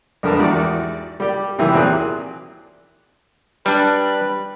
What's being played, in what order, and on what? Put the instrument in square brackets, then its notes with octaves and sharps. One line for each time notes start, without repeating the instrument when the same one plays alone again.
[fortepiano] A#1 F2 D3 A#4 B4 A5
E2 G#2 F#4 G4 D5
G3 G4
C3 D#3 E3 F#3
E2 A#2 C4 G4 G#4 F#6
[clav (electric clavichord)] G3 D4 [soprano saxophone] B4